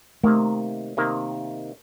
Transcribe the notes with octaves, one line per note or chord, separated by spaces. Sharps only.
C3 D#3 A3 A#3
C3 D#3 A#3